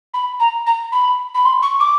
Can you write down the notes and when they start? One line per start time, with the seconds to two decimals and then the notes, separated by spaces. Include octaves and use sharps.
0.13 B5
0.40 A#5
0.66 A#5
0.92 B5
1.34 B5
1.45 C6
1.62 C#6
1.80 D6